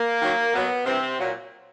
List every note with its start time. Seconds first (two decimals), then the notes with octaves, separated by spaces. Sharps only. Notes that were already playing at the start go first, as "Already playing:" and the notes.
Already playing: A#3
0.21 F#2 D#3 F#3
0.53 B2 F#3 B3
0.85 G2 C3 E3 C4
1.18 A#2 F#3